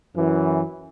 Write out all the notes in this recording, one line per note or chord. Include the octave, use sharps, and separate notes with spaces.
F#2 E3